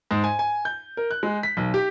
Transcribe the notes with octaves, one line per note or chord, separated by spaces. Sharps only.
G#2
G#5
G#5
G6
A#4
F#6
G#3
B6
B1
G4